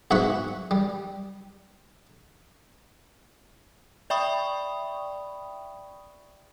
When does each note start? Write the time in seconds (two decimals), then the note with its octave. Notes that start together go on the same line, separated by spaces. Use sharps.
0.11 B1 G#2 E5 F#5 B5 C#6
0.71 G3
4.10 D5 E5 G5 B5 C#6 D#6